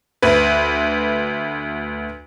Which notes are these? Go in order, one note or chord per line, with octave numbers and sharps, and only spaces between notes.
D2 B4